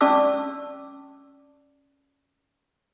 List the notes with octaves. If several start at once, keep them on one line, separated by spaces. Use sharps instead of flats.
C#4 G4 D5 A5 D6 E6